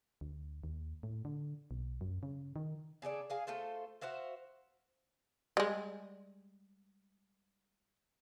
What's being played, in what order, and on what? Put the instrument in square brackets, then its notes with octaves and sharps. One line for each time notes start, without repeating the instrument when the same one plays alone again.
[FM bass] D2
D#2
A2
D3
B1
F#2
C#3
D#3
[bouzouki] C#3 G#4 A4 D5
G#4 F5 G#5
A3 F4 A4 C5
F#4 C5 E5 F5
[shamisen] G3 G#3